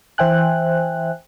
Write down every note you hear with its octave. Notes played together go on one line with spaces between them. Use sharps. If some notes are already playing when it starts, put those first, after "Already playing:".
E3 C5 E5 G5 G#5 F#6